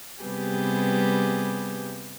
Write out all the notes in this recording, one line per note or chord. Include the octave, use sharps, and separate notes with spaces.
C3 G3 B3 G4 G#4 B4